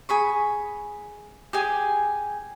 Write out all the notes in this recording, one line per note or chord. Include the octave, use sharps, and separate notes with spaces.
G#4 B5 C#6
G4 G#4 G#5